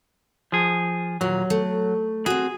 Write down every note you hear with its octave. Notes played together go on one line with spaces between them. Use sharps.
F3 G#4
D#2 A#2 F#3 F5
A3
C4 F#4 G#4